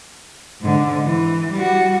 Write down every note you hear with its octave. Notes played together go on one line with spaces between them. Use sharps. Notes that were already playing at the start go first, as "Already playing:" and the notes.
G#2 D3
E3
G3 F#4